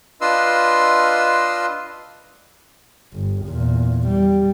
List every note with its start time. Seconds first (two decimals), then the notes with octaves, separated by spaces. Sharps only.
0.21 D4 F4 B4 D#5 C6 E6
3.13 G1
3.45 E2 A#2
4.07 G3